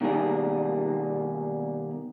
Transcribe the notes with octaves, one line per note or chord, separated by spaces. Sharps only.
B2 D#3 G3 A#3 G#4